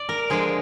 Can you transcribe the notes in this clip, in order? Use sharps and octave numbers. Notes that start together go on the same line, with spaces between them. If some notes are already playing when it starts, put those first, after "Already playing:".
Already playing: D5
A#4
D3 F3 G#3 G#4